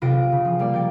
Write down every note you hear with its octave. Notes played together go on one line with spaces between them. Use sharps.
B1 C3 F4 A6 A#6 D7
C3
C#3
F3
G3 A#3 D5
G5 A6 D7